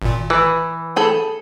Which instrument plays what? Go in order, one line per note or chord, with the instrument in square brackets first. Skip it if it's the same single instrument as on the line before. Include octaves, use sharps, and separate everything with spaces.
[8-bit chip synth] G#1 A#2
[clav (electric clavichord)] E3 [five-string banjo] B4
[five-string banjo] G#4 A4 B5